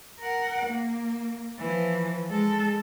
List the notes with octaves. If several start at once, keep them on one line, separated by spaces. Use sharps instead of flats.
A#4 F#5
A#3
E3 F3
G#3 A4